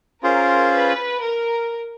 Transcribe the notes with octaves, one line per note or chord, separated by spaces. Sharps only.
C#4 F4 G#4 A#4 C5
B4
A#4